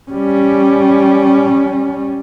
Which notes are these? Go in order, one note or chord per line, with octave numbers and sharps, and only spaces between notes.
G3 C#4